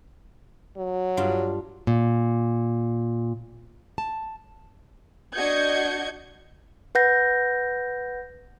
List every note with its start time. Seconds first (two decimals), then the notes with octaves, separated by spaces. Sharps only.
0.77 F#3
1.17 G2 D4 F4
1.87 A#2
3.98 A5
5.35 D4 F#4 D#5 G6 G#6 C#7
6.95 B4 F#5 G6 A#6